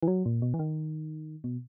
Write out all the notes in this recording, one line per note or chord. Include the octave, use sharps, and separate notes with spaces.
E3
F#3
A#2
B2
E3
D#3
B2